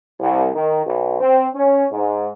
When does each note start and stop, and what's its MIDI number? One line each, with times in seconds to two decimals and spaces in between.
0.20 0.49 36
0.54 0.83 51
0.85 1.20 35
1.20 1.46 60
1.53 1.85 61
1.91 2.30 44